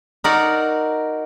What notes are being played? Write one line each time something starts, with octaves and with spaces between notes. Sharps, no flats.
D#4 F#4 A#4 D5 F#5